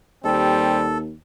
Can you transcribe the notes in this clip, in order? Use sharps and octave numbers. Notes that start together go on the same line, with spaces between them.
D#2 G3 C4 A4